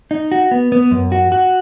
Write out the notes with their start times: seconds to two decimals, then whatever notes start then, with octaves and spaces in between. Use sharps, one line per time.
0.11 D#4
0.32 F#4
0.51 B3
0.72 B3
0.91 F#2
1.12 F#4
1.32 F#4